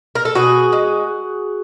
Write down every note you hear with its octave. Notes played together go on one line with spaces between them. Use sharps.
A#4
A4
B2 F#4 G#4
G#3